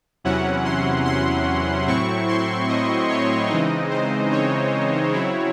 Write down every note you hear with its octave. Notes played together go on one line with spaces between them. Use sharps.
E2 C3 F#3 C#4 E4 F#5
C6
C6
A2 F#3 C4 E4 C#6
C6
D#5
C#5
C#3 E3 G#3 C4 D#4 D#5
C5
C#5
C#3 F#3 C4 E4